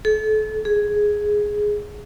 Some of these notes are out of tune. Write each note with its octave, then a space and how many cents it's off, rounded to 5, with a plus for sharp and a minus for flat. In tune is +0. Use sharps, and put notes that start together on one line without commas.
A4 -35
G#4 +0